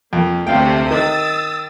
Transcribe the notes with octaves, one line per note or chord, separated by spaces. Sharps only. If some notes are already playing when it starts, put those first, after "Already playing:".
F2 A#3
D2 C3 A3 F5 G5
D#3 D#6 E6 A6